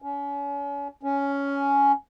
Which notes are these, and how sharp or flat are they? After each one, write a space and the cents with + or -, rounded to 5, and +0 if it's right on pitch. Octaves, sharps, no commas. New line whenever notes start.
C#4 +35
C#4 +10